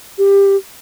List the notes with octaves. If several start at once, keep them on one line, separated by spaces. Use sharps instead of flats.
G4